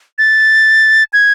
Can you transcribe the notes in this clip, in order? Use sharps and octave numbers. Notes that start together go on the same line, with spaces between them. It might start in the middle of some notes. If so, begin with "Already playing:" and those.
A6
G#6